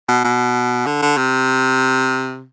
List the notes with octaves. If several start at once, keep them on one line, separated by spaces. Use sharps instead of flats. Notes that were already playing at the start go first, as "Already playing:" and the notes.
B2
B2
D3
D3
C3